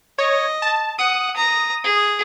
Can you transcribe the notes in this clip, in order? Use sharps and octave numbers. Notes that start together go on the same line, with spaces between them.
C#5 D#5
A5
F#5 D#6
A#5
G#4